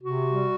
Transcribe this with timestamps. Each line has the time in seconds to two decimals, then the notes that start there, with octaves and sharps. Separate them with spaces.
0.02 C3 F#4
0.27 G3